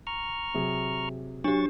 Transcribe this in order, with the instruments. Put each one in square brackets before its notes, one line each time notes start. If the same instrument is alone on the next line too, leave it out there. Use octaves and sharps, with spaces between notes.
[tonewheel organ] A#5 C#6 F6
[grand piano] C3 F#3 G#4
[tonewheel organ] F#3 C#6 A6 [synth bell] D4 G4